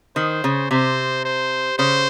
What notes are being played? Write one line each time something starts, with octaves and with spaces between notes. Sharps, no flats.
D#3 C5
C#3
C3 C5
C5
C#3 C5